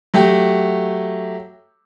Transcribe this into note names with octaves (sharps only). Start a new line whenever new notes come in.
F#3 A3 G4